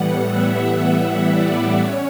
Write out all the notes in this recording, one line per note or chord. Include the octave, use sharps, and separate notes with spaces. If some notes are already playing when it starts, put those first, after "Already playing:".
Already playing: A2 E3 G3 B3 F#5
E5
E5
D5
C#4 C#5